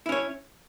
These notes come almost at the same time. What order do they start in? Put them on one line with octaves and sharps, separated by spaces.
E4 C#4 C#5